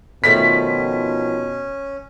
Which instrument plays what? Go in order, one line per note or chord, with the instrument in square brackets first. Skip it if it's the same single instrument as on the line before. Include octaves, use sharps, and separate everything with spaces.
[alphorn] B2 [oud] D#3 F3 A3 [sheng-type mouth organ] C#4 [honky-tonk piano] B6